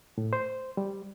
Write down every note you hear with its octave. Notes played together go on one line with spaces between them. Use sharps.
A2
C5
G3